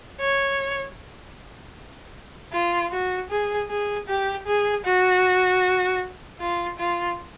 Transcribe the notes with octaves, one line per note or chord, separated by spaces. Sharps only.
C#5
F4
F#4
G#4
G#4
G4
G#4
F#4
F4
F4